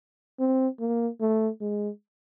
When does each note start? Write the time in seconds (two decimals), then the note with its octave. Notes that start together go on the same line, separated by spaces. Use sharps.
0.39 C4
0.80 A#3
1.20 A3
1.61 G#3